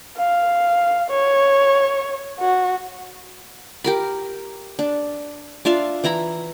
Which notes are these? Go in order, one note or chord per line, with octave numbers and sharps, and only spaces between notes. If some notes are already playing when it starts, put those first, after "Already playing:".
F5
C#5
F#4
G4 A#4 B5
D4
D4 F4 E5 F5
E3 E4 A#5 B5